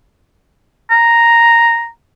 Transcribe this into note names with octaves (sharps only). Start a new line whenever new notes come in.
A#5